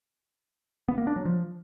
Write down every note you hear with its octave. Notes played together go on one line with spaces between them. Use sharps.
B3
A#3
D4
F#3
F3